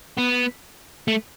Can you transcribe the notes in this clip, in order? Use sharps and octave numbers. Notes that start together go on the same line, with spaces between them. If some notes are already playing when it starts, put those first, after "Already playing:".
B3
A3